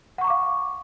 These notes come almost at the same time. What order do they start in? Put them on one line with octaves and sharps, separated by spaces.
F#5 C#6 A#5 D6 F5